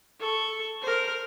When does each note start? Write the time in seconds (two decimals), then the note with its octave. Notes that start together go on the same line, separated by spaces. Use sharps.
0.20 A4 C#6
0.82 A#4 C5